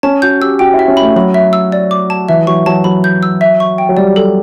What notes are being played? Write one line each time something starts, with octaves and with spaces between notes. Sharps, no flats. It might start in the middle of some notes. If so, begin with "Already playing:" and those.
C#4 A5
F#4 G6
G4 E6
F#4 G5
E4
E5
C#4
B5
A3
F#3 B5
E5
E6
D5
D6
A5
E3 E5
F#3 C#6
F#3 A5
F#3 B5
G6
E6
E5
C#6
G5
F#3
G3 D5
A4